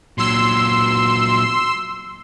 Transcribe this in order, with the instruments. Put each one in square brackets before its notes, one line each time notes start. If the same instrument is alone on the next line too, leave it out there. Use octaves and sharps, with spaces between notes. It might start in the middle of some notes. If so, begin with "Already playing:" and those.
[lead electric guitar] A#2 F#3 [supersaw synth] C6 E6